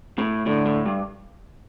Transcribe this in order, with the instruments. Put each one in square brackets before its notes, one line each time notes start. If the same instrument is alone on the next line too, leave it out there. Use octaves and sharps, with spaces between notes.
[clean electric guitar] A2
[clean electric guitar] A2 [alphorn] D3
[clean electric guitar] A2
G2